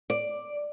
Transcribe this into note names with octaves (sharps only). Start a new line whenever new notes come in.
D5